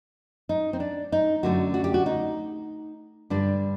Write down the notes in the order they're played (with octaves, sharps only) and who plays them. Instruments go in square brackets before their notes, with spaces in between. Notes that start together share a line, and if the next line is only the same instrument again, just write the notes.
[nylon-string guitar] D#4
C4
D4
D#4
F#2 D3 A3 F#4
F#4
G4
F#4
D#4
G2 D3 G3 D4